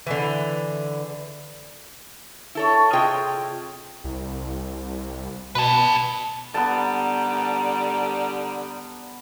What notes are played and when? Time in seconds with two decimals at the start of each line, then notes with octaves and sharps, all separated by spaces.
0.07 D3 E3
2.55 E4 A4 C#5
2.93 C3 F4 G#4 C#5 D#5 G5
4.04 C2
5.55 B2 B4 A5
6.54 D3 G3 B3 A5 A#5